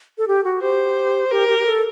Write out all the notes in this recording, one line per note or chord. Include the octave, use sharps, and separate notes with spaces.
A4
G4
F#4
G4 C5
G4 A#4
G4
G4
A4